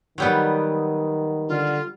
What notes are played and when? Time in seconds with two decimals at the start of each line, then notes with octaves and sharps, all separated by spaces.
0.18 D#3 F#3 G3 B3
1.48 D3 F4